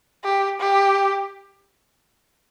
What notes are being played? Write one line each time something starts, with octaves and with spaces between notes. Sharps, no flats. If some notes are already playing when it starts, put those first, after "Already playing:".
G4
G4